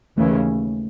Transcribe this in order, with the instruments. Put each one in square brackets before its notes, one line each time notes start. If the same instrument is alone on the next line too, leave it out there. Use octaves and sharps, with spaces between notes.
[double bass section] D#2 C#3 E3 [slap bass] A3